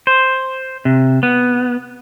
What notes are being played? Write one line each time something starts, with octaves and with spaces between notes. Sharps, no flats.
C5
C3
B3